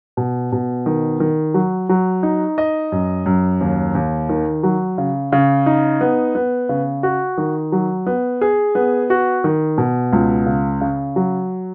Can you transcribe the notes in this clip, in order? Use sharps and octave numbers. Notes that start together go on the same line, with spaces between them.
B2
B2
D#3
D#3
F#3
F#3
D#4
D#5
F#2
F#2
D#2
D#2
D#3
F#3
C#3
C#3
D#4
B3
B3
C#3
F#4
D#3
F#3
B3
G#4
B3
F#4
D#3
B2
C#2
C#3
C#3
F#3